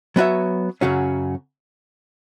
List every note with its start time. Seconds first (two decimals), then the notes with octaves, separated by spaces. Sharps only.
0.16 F#3 B3 F#4 C#5 E5
0.81 F#2 C#3 F#3 C#4 F#4